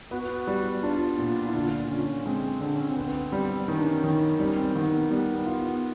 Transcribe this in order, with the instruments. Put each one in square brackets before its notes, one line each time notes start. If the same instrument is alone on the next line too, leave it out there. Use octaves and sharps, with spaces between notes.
[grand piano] B3 [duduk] F#4
[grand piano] G3
[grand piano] D4 [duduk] F4
[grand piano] A#2
[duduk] E4
[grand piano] D3 [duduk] F4
[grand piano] D3 [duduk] C#4
[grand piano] G#3 [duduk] C4
[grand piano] D3 [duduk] C4
[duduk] C#4
C4
[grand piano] B3
G3
[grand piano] D#3 [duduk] C#4
[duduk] D4
C#4
[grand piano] D#3
[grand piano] G3 [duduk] C4
[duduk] C#4
C4
[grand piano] D#3 [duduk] B3
[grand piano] G3 [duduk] B3
[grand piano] F4